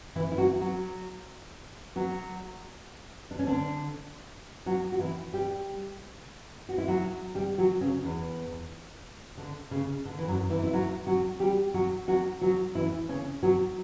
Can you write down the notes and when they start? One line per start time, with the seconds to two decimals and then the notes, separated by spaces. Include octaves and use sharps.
0.16 E3 E4
0.32 E4
0.38 F#3 F#4
0.61 F#3 F#4
1.96 F#3 F#4
3.31 D4
3.39 C#4
3.47 D3 D4
4.66 F#3 F#4
4.92 F#4
4.99 E3 E4
5.33 G3 G4
6.69 F#4
6.78 E4
6.88 F#3 F#4
7.35 G3 G4
7.58 F#3 F#4
7.81 C#3 C#4
8.04 E2 E3
9.38 D3
9.71 C#3
10.05 D3
10.18 E3
10.28 F#2 F#3
10.50 E3 E4
10.63 E4
10.73 F#3 F#4
11.07 F#3 F#4
11.40 G3 G4
11.74 F#3 F#4
12.08 F#3 F#4
12.41 F#3 F#4
12.75 E3 E4
13.09 C#3 C#4
13.43 F#3 F#4